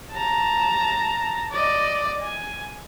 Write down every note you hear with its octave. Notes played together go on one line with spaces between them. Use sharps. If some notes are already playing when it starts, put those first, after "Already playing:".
A5 A#5
D5 D#5
G#5